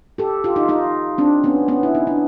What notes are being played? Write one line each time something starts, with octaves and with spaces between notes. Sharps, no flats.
G4 A4
F4 G4
D#4 F4
D#4 F4
C4 D4
B3 C#4
B3 C#4
E4
D#4
D4